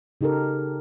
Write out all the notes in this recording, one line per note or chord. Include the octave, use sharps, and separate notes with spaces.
C#3 D#4 G4 A4 A#4